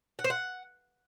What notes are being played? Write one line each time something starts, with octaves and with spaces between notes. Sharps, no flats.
F#5
C5
F#5